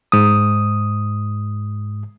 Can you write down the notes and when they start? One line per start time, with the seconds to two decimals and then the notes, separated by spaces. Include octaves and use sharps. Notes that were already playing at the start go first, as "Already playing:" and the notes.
0.12 G#2 D#6